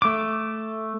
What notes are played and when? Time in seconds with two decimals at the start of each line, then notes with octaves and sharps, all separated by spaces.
0.02 A3 D6